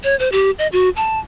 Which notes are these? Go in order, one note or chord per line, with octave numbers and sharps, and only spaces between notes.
C#5
C5
G4
D#5
F#4
A5